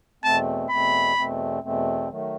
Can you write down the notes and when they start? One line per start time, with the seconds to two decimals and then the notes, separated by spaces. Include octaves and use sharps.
0.24 E2 B2 A3 C4 A5
0.70 E2 B2 A3 C4 B5
1.16 E2 B2 A3 C4
1.62 E2 B2 A3 C4
2.09 D#3 F#3 A3